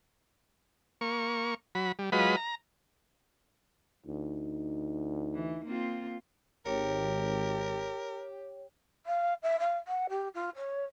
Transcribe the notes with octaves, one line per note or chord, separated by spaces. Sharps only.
A#3 C#6
F#3 B5
G3
F#3 G#3 F4 B4 D#5 B5
A#5
D2 D#4
E3
A#3 C4 F4
G#1 G4 A#4 C#5
F5
E5
F5
F#5
G4
F4
C#5